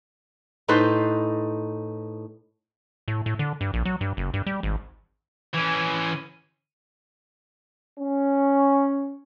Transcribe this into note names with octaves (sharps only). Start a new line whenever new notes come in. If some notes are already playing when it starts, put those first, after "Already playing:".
A2 D#4 A4 B4 C5 C6
A2
A2
D3
G2
A#1
F#3
G2
F#1
G2
G3
G#1
E3 C#4
C#4